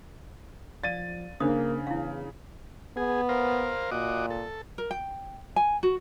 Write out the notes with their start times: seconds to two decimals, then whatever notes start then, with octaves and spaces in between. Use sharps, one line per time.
0.84 F3 D5 F5 A6 D#7
1.40 C#3 A#3 D4 C5 D#6
1.87 E2 E4 F5
2.97 B3 G#4
3.29 A#4 C5 F5
3.91 A#2 F#4 D#5 D6
4.30 A4
4.78 A#4
4.91 G5
5.56 G#5
5.83 F#4